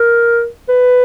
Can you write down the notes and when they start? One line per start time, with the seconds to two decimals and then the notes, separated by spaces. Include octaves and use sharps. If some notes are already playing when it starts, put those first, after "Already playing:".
Already playing: A#4
0.69 B4